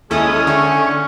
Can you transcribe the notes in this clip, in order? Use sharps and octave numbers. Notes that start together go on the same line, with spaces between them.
D#2 G#3 C#4 E4 G#4 A4 D#6
D3 E5 G5 G#5 C#6